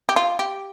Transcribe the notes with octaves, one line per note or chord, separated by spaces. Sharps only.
G4
F4
G4